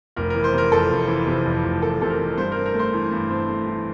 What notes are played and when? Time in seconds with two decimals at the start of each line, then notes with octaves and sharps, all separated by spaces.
0.17 F1 A#4
0.30 E3 A#4
0.44 C5
0.54 C3 A#4
0.72 F2 A4
0.90 F1
1.08 E3
1.27 C3
1.46 F2
1.64 F1
1.82 E3 A4
2.01 C3 A4
2.10 A#4
2.19 F2
2.37 G2 C5
2.52 C4 A#4
2.66 A#4
2.75 A3 C5
2.93 E3
3.11 G2
3.30 C4
3.48 A3
3.66 E3